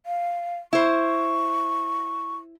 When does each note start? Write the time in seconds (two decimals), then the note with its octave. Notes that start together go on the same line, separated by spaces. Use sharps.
0.06 F5
0.73 E4 C5 C#6